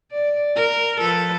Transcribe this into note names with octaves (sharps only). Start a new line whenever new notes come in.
D5
A#4
F3 A4 B4